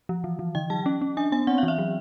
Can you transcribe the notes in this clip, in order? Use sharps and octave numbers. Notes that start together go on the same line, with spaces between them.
F3
E3
E3
D3 G5
F#3 A5
C#4
C#4
D4 G#5
B3 G#5
C4 F#5
F5
E3
E5
F#3